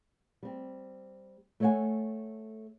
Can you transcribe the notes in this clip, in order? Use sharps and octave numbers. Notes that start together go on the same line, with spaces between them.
G3 C4
A3 A4 C#5 D#5 F#5 G#5